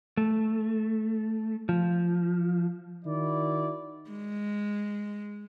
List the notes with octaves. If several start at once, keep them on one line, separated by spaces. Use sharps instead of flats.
A3
F3
D#3 E4 F#4 D5
G#3